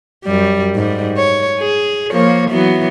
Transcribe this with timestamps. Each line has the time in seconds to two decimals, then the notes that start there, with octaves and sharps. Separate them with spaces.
0.25 F#2 G3
0.76 G#2 G3
1.18 C#5
1.59 G#4
2.11 F3 A#3 C#5
2.51 E3 F#3 B3